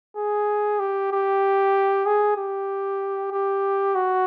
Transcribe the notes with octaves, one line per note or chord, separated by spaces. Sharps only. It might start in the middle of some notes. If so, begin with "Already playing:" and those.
G#4
G4
G4
G#4
G4
G4
F#4